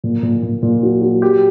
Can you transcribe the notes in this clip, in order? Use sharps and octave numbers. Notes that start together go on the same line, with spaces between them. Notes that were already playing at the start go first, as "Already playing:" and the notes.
A#2
A#2
A#2
A#2
F#3
F#3
G4